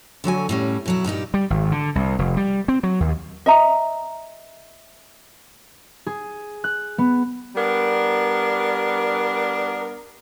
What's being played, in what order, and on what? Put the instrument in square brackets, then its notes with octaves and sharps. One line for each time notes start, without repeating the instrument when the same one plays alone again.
[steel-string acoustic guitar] D3 F#3 F#4 G#5
A2 G3 C#4
B2 F#3 E4
G2 A#2 D#4 G4
[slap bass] G3
G#1
D3
C2
F1
G3
C4
F#3
D#2
[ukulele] D#5 E5 A#5
[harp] G#4
F#6
B3
[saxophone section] G3 B3 D4 A#4